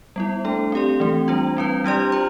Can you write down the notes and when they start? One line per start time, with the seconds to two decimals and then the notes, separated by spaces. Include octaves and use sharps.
0.16 G3 B3 E4
0.45 A3 D4 A4
0.72 C4 G4 D5
1.00 E3 A3 C4
1.28 G3 D4 F4
1.57 G3 C4 E4 B4
1.84 G3 D4 G4 D5
2.12 F4 C5